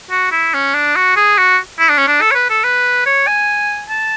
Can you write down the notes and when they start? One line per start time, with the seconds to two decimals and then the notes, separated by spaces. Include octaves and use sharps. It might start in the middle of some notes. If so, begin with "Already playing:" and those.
0.11 F#4
0.32 E4
0.54 C#4
0.74 D4
0.96 F#4
1.16 G#4
1.38 F#4
1.79 E4
1.89 D4
1.98 C#4
2.07 D4
2.21 A4
2.31 C#5
2.35 B4
2.50 A4
2.64 B4
3.06 C#5
3.27 G#5
3.90 A5